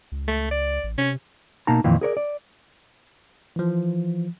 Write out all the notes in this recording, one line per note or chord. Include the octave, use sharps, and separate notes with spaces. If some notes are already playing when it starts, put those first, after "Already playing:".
C#2
A3
D5
A1
C3 C#4
B2 A#3 D#4 A5 A#5
F2 A#2 D#3 E3
G#4 A#4 C#5 D5
D5
E3 F3